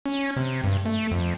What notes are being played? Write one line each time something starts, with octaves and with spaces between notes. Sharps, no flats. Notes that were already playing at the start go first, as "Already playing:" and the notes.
C#4
C3
G2
A3
F2